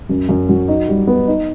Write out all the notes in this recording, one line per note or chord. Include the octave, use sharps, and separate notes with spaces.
F#2
F#2
F#3
D#4
G3
B3
D#4